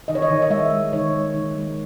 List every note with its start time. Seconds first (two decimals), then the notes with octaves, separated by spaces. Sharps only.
0.08 D#3 D#5
0.15 C#5
0.22 D#5
0.30 D#3
0.42 D#5
0.50 G#3 E5
0.71 G#3
0.93 D#3 C#5
1.13 G#3
1.35 D#3
1.55 G#3